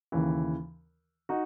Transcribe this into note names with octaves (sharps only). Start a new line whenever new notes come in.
D#2 C#3 E3
D#4 F#4